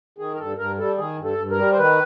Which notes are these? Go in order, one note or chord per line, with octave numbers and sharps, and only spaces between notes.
D#3 G#4
A#4
G2 A4
G2 A#4
G3 A4
D#3 G#4
G2
A4
G2
A#4
G3
C5
D#3 B4